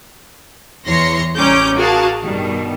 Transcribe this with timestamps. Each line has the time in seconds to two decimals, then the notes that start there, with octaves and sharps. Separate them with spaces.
0.85 E2 E3 C#5 C6 A#6 C#7
1.37 A1 G3 C#4 A#5 D6 G6
1.76 F#4 G#4 A#4 F5 A5
2.23 G2 B2 D#3 G3